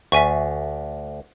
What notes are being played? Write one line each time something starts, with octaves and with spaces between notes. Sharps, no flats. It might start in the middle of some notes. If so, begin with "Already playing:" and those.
D2 E5 G#5 C#6